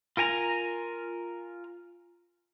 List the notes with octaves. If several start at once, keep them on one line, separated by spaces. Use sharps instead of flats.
F4 A#4 G#5 A#5